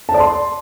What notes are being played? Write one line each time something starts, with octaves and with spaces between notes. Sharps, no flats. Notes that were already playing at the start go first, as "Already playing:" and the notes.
A5
D5
C6